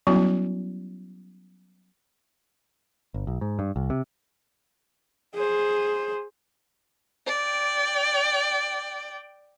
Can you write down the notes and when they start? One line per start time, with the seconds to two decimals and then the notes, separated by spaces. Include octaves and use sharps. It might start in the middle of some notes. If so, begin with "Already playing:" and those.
0.07 F#3 G3 B3 C#4 E4 F#4
3.14 G1
3.27 B1
3.41 G#2
3.59 G2
3.76 C2
3.90 C3
5.35 G#4 C5
7.27 D5 G5